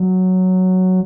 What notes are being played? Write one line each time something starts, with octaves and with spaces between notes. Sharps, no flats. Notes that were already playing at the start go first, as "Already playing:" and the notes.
Already playing: F#3